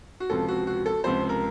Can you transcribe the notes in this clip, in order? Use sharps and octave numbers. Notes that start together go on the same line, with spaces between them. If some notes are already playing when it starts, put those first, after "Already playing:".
F#4
C#2 C3 F3 A4
F#4
F#4
A4
C#2 C3 F3 C5
A#4